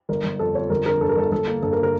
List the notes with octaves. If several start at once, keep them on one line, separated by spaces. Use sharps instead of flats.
G1 A#4
G1
F2 A4
F2 C#5
G1 A#4
D3 A#4
G2 A4
A#4
G1 A4
G1 A4
A#3
G2 A4
A#4
A#4